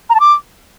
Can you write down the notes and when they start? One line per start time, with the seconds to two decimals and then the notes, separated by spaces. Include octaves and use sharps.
0.10 A#5
0.15 A5
0.20 D6